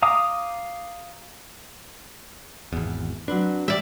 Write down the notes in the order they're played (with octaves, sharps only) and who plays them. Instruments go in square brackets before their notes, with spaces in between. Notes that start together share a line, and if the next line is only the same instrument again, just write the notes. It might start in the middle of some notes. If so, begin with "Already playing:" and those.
[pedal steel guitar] F5 A#5 D6 D#6
[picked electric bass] G#1 E2
[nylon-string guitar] F#3 C4 B4 [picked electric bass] D4
[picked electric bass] G3 [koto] D5 E5